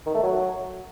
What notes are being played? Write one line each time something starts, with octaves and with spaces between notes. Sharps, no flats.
D#3
A3
F#3